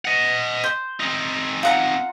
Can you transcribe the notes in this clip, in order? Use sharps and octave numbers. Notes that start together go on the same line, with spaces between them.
D#5 F#5
C5
C4 D#4
F4 F#5 A#5